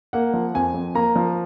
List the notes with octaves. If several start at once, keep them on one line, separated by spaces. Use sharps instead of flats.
A#3 F#5
F3
F2 G#5
F2
A#3 A#5
F3